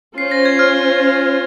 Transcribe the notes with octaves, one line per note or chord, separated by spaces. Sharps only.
C#4 F4 C5 C7
A#6
G#6
F6